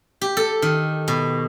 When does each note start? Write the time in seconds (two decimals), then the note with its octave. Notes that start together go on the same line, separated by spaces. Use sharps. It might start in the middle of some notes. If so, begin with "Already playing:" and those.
0.21 G4
0.37 A4
0.62 D#3
1.08 B2